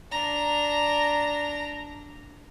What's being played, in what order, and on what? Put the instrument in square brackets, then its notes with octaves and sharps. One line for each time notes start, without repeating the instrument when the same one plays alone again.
[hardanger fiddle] D4 A#5